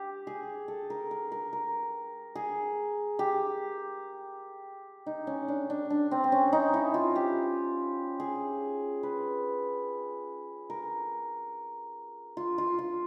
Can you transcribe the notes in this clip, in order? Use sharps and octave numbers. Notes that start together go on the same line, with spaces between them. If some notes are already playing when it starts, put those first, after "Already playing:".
Already playing: G4
G#4
A4
A#4
A#4
A#4
A#4
G#4
G4
D#4
C#4
D4
D4
D4
C4
C4
C#4
D#4
E4
F4
G4
G#4
B4
A#4
F4
F4
F4